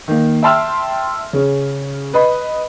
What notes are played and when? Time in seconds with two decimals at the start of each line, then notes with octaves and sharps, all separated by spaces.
0.08 D#3 A#3
0.43 E5 G5 A5 C6 E6 F6
1.33 C#3 C#4
2.13 B4 D#5 B5